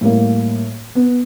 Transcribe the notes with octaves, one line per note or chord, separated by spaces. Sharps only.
A2 G3 A#3
B3